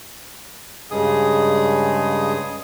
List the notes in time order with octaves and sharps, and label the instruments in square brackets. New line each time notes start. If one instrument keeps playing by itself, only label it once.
[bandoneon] G2 C#3 G#3 G#4 D#6